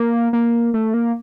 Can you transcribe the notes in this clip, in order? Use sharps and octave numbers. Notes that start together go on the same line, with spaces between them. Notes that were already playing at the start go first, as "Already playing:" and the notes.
Already playing: A#3
A#3
A3
A#3